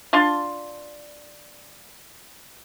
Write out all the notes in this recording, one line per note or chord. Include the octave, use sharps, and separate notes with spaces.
D4 F4 A5 C6